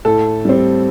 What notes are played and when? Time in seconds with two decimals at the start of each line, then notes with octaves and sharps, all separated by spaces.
0.05 A2 A4
0.45 G3 C4